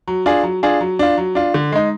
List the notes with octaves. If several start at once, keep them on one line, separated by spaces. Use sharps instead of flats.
F#3
D4 F4 G#4
F#3
D4 F4 G#4
F#3
D4 F4
F#3
D4 F4
D3
G#3 D#4